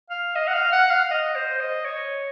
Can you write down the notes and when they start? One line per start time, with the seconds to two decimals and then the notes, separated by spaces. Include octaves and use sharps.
0.10 F5
0.35 D#5
0.47 F#5
0.54 F5
0.72 F#5
0.91 F5
1.10 D#5
1.35 C5
1.60 D#5
1.85 C#5